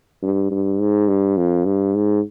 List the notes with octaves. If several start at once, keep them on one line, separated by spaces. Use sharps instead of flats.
G2
G2
G#2
G2
F2
G2
G#2